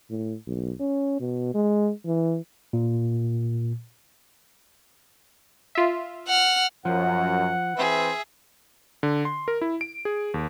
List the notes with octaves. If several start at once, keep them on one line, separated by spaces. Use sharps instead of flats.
A2
B1
C#4
B2
G#3
E3
A#2
F4 E5
F#5 F6
F#2 F3 F#5
E3 C4 G#4 B4 E5
D3
C6
A#4
E4
D7
G#4
D#2